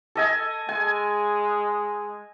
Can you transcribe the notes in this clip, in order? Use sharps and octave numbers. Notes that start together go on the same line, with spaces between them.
A4 D#5 G#5
G#3 G#5